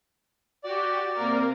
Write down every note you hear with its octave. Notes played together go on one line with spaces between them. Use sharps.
F#4 G4 D5
C3 A#3 A#4